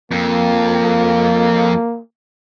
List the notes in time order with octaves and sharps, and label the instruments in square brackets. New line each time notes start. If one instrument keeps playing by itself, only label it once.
[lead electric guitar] F2 [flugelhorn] A#3